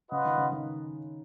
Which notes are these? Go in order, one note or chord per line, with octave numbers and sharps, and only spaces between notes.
C#3 F4 B4 D#5 F#5
D#3
C#3
D#3